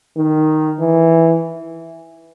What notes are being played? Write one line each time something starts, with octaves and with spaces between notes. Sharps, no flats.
D#3
E3